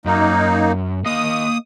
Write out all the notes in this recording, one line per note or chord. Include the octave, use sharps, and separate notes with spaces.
F#2 A#3 D#4
A#3 D#5 F5 D#6